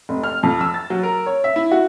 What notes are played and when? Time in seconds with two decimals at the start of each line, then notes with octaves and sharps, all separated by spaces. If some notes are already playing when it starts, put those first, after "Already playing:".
0.09 F1
0.24 F6
0.43 F2
0.61 E6
0.74 A6
0.90 F#3
1.03 A#4
1.26 C#5
1.44 E5
1.56 E4
1.71 F#4